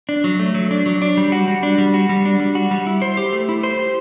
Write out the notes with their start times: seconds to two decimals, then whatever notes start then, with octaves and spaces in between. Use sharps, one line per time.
0.09 D4
0.24 F#3
0.39 A3
0.54 F#3
0.71 D4
0.86 F#3
1.02 D4
1.17 G3
1.32 F#4
1.48 G3
1.63 D4
1.78 G3
1.94 F#4
2.09 G3
2.25 D4
2.40 G3
2.55 F#4
2.71 G3
2.87 E4
3.02 C5
3.17 G4
3.33 A3
3.49 E4
3.63 C5
3.79 G4